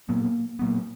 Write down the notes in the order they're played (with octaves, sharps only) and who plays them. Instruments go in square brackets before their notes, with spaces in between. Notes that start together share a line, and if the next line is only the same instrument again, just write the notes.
[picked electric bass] A#2 F#3 B3 [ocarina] A#3
[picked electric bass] A#2 F#3 B3 [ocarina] A#3